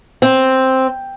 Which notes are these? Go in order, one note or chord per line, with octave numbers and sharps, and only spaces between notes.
C4